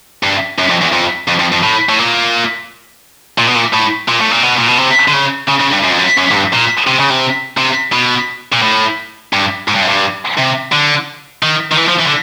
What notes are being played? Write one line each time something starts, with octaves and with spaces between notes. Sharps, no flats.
G2
F#2
F2
E2
F2
F2
F2
F2
A2
A2
A#2
A#2
B2
A#2
A2
A#2
A2
A#2
B2
A#2
B2
C3
D3
C#3
C#3
C#3
G2
F#2
F2
F#2
F#2
G#2
G2
A#2
C3
C#3
C3
C3
B2
A#2
A2
G2
G#2
G2
F#2
G2
C3
D3
D#3
D#3
E3
F3
E3
D3